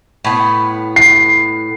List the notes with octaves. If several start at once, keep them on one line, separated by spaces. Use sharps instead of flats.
A2 B3
C7